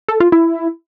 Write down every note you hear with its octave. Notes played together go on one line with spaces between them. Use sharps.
A4
F4
E4